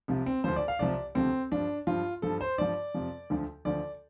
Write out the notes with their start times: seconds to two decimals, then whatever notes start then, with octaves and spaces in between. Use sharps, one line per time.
0.08 C2 C3 F3
0.26 C4
0.44 D2 D3 F3 C5
0.56 D5
0.68 F5
0.79 C2 C3 F3 D5
1.15 D2 C3 F3 C4
1.52 G2 F3 D4
1.87 G2 F3 F4
2.22 G2 F3 A4
2.41 C5
2.58 G2 F3 D5
2.94 F2 C3 F3
3.30 D2 D3 F3
3.65 D2 D3 F3 D5